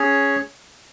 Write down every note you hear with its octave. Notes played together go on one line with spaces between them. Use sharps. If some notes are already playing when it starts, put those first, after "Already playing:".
Already playing: C#4 G#4 C#5